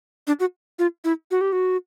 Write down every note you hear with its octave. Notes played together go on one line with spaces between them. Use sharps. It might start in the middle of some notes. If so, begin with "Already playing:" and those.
D4
F#4
F4
E4
F#4
G4
F#4